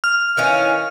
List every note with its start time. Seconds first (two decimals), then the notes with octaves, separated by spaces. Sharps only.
0.04 F6
0.37 D#3 E3 C#4 F5